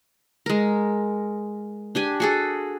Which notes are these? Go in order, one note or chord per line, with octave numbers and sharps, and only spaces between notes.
G#3 A#4
D4 G4 G#5
F#4 G#4 A4